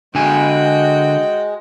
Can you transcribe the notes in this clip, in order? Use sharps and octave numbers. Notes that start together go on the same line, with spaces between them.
D3 G#3 F#4 G5 G#5